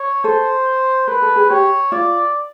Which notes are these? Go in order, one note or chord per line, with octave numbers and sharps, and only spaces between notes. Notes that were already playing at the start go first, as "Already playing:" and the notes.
Already playing: C#5
A4 C5
A#4 B4
A4
G#4
G4 C#5
F4 D5